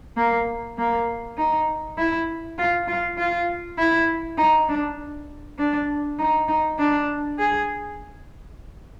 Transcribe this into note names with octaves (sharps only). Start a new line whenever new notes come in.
A#3
A#3
D#4
E4
F4
F4
F4
E4
D#4
D4
D4
D#4
D#4
D4
G#4